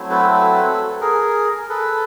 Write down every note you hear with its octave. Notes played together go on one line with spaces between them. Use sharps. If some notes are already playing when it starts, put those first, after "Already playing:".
Already playing: F#3 A3 C4 E4
A4 B4
A4 B4
G#4 A#4
A4 B4